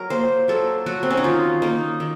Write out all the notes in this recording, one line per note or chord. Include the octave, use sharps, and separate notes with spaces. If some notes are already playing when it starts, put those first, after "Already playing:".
Already playing: F#3 A#4
A#3 C5
F#3 A4
F#3 F#4
C4
C#4
D#4
D#3 F4
A#3 D#4
D#3